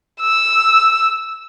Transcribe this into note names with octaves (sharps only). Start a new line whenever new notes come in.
E6